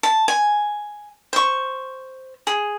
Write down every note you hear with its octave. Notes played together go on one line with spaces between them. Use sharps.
A5
G#5
C5 C#6
G#4